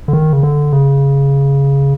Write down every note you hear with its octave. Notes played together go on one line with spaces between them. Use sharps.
D3
D#3
C#3
D3
C#3